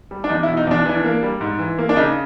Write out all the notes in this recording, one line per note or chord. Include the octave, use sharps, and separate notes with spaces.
G3
D4
E2 D#4
E4
B2
D#4
E2 D4
E3 D4
A#3
G3
G#2
E3
A#3
D4
C#3 D#4